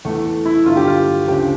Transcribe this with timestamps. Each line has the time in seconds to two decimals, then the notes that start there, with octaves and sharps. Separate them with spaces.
0.05 E2 A3
0.09 E3
0.25 A3
0.45 E4
0.66 G1 G2 D3 F4
0.77 G4
0.88 F4
1.28 D2 C#3 F3 G4